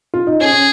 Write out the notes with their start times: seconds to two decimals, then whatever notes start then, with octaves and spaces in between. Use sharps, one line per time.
0.14 F4
0.27 D#4
0.41 C#4 G#4
0.52 C#4